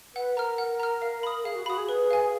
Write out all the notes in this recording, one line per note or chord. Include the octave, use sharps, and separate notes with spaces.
B4 F#5
A#4 A#5 F6
F#5
A#5 F6
F5
B5 D#6
G#4 F5
F#4
F#4 B5 D#6
G#4
B4
F5 G#5